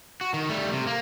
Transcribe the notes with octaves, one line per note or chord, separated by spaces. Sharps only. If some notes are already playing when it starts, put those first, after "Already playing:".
F#4
D#3
G3 A3
C3
A#3